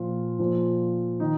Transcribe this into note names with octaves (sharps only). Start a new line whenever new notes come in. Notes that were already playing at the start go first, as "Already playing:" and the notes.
Already playing: A#2 F3 F4
A#2 F3
D#3 D#4